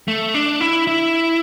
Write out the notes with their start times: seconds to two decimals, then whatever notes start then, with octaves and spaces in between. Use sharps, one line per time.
0.08 A3
0.34 D4
0.61 E4
0.87 E4